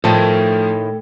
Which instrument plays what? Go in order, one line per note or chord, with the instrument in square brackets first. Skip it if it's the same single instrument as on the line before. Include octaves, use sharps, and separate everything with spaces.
[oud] A2 D#3 [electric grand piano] F3 A3 A5 [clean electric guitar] A4 G5